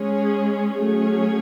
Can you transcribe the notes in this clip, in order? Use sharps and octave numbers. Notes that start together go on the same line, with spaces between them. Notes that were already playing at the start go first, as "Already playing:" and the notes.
Already playing: G#3 C#4 G#4 C#5
F#3 A3 C#4 G#4 C#5